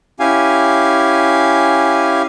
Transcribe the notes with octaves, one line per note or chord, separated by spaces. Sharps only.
C#4 E4 G4 F5 G#5